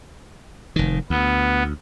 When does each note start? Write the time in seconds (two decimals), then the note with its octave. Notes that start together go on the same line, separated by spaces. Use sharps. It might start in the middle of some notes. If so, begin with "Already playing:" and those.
0.76 F1 D#3
1.10 D2 B3